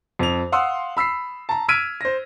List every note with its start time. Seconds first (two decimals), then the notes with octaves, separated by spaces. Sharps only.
0.19 F2 F7
0.52 F5 F#5 C6 D#6 E6
0.97 B5 E6 B6 C7
1.49 A5 A#5
1.69 E6 F6 G#6 B6 D7 D#7
2.01 C5 A#6